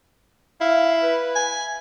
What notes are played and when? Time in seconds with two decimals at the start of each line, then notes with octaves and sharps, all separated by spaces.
0.61 E4 F5
1.03 B4
1.35 G#5